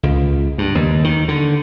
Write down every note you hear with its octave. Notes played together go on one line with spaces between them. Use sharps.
C#2
G2
D#2
D#3
D3